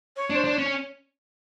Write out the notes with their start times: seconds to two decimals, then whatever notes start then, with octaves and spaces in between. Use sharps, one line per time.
0.16 C#5
0.30 D4
0.35 C5
0.44 D4
0.53 C#4 C#5